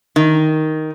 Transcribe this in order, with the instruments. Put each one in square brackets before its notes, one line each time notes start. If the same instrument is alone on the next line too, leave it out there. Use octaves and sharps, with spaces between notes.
[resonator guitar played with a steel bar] D#3